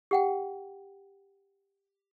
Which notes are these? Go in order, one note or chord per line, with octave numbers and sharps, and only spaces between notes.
G4 F#5 G5